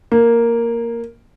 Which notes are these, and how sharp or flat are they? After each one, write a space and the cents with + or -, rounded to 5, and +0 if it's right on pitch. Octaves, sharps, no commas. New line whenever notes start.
A#3 +0